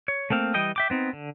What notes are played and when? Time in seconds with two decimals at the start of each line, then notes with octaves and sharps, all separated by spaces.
0.08 C#5
0.30 A3 A#3 C4 F5
0.54 E3 G3 D#5 G5 D#6
0.76 E5 G5 D6
0.90 B3 C4 D#4
1.13 D3